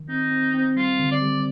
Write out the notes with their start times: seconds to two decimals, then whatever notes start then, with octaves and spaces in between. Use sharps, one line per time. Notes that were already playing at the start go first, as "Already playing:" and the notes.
Already playing: D#3
0.09 C4 D#4
0.31 C4
0.54 C4
0.76 G3 F4
0.99 D3
1.11 D5
1.22 G3